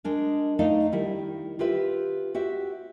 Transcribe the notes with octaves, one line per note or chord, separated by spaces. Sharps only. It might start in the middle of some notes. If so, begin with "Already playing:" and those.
G#3 D4 A#4
A3 D#4 D5 D#5 F5
D#3 G3 E4
F4 G4 B4 E5
F#4 G4 E5